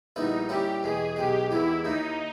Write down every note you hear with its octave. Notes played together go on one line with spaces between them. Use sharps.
A#1 A#2 G3 B3 D#4 E4
A#2 G3 C#4 E4 G4
E2 B2 G#3 G#4
B1 B2 G#3 G4
E2 D#3 G#3 B3 E4
D#2 D#3 A#3 D#4